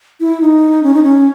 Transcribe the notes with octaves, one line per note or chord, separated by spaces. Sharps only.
E4
D#4
C#4
D#4
C#4